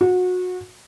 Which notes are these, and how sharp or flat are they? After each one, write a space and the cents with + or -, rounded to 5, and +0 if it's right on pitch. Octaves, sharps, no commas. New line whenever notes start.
F#4 -25